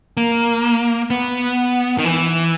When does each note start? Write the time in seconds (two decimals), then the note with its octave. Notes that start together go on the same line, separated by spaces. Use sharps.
0.17 A#3
1.10 B3
1.98 D#3
2.05 E3